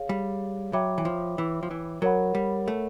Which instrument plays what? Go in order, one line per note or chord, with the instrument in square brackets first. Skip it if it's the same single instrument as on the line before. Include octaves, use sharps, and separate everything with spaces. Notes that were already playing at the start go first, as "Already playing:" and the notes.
Already playing: [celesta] G#4 C#5 F5
[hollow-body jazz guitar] G3
[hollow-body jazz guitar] F#3 [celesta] C#5 E5 G5 B5 D6
[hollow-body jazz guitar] E3
F3
E3
F3
E3
[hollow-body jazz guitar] F#3 [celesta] A#4 C#5 F#5 B5
[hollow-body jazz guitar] G3
A3